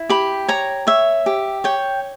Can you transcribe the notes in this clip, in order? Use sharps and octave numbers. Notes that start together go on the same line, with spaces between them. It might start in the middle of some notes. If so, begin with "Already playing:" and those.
Already playing: E4
G4 B5
C#5 A#5
C#5 E5
G4
C#5 G5